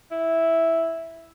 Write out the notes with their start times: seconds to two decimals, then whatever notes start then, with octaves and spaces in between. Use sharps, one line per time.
0.11 E4